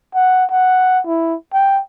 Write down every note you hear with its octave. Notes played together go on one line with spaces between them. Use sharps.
F#5
F#5
E4
G5